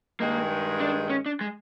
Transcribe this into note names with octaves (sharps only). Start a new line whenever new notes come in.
G2 D#3 G#3 A#3
D4
C#4
D4
G#3